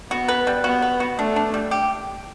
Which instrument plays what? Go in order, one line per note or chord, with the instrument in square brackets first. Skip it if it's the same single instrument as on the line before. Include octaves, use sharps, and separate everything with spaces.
[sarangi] B3 [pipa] F#4
[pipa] B4
G3
[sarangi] B3 [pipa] F#4
[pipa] B4
F#4
[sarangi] A3 [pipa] D4
[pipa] D4
G3
G4